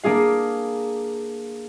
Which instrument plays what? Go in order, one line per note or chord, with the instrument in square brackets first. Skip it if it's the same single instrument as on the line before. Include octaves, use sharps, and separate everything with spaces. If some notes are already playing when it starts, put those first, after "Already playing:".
[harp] A#3 D4 G#4 F5